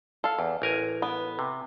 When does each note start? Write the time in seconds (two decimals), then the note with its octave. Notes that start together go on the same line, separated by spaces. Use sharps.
0.24 A4 F5
0.39 E2
0.62 A1 A#4 G#5
1.02 B3
1.39 C3